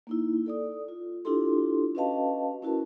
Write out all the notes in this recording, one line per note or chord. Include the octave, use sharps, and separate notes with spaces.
A#3 D#4 E4
A4 D5 D#6
F4
D4 E4 F4 G4 A4 C6
C#4 F#4 B4 D#5 F5 A5
C#4 E4 F#4 A#4 A5